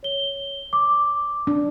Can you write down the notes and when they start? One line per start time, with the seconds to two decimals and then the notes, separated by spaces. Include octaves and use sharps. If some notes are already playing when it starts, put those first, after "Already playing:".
0.03 C#5 G7
0.73 D6
1.47 D4